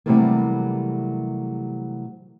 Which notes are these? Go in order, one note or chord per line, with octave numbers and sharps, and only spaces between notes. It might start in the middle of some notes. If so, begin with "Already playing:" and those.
C3 E3 F#3 G3 A3 A#3